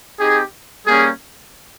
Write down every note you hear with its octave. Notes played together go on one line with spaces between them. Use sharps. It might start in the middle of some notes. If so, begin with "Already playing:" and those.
C4 D#4 G4 G#4
G3 A#3 C#4 G#4